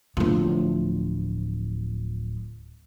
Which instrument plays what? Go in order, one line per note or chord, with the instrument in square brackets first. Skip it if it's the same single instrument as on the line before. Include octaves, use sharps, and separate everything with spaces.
[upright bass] D1 F3